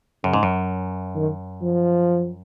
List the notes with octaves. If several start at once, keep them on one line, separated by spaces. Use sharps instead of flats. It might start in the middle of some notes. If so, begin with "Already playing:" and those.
F#2 C#3
G#2
F#2
D#3
F3